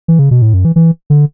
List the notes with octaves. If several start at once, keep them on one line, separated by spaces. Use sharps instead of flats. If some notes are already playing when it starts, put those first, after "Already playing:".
E3
C#3
B2
A2
F#2
E3
E3
D3